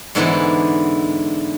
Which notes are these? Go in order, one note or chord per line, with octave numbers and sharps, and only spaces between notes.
G#2 D3 E3 B3 D#4 E4